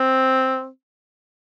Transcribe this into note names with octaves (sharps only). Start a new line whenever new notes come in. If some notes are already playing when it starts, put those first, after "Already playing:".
Already playing: C4